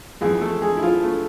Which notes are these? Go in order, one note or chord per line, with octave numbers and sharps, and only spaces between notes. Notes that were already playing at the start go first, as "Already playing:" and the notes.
F2 E3 G#3 G#4
A3 A4
G#3 G#4
E4
F3 F4
A3